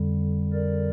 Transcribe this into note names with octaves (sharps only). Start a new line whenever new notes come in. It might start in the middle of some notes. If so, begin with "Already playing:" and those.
Already playing: F2 D3 G3
A#4 D5